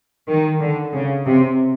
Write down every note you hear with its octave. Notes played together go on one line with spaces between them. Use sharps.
D#3
D3
C#3
C3